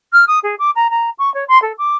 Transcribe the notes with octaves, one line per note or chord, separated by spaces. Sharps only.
F6
D#6
G#4
D6
A#5
A#5
C#6
C#5
C6
A4
D6